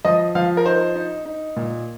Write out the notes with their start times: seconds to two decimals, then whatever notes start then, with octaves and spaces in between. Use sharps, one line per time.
0.05 F3 D#5
0.35 F3 F5
0.57 A#4
0.65 D#4 C5
0.96 D#4
1.25 D#4
1.56 A#2